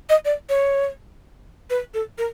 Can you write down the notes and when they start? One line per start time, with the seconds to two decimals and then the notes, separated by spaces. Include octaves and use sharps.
0.09 D#5
0.25 D5
0.49 C#5
1.70 B4
1.94 A4
2.18 A#4